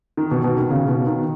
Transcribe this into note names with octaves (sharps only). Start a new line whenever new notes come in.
D#3
B2
B2
D#3
C#3
B2
D#3